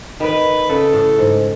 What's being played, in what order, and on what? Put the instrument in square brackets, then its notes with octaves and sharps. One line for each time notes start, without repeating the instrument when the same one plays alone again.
[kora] D#3 [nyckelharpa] B4
[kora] C#3 [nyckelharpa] A4
[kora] A2
G#2